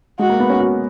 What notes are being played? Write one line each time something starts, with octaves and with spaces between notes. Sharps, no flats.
G#3 F#4
A#3
B3
C#4
F#4